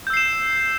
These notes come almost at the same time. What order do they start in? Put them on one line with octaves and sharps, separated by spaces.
G6 E6 C7 E7